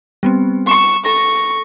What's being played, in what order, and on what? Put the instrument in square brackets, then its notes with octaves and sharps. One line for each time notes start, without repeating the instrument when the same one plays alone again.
[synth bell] G3 B3 C4
[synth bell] B5 E7 [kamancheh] C#6
[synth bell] A4 B5 A#6 [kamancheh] C#6